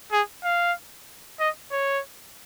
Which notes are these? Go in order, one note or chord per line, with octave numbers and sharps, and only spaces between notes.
G#4
F5
D#5
C#5